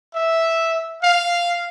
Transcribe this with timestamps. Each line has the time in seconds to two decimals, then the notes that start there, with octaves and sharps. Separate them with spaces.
0.14 E5
1.02 F5